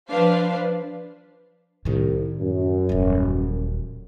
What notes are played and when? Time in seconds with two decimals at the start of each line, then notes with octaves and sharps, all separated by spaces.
0.10 F3 D4 B4 C5 F5
1.85 C2 A2 D#3
2.41 F#2
2.89 D#1 E3